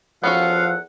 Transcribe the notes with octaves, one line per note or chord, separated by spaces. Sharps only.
E2 F3 B3 C#4 F#4 A4 F5 F#5